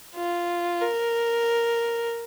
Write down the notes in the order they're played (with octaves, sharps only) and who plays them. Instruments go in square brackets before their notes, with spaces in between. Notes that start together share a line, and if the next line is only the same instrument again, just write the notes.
[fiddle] F4
A#4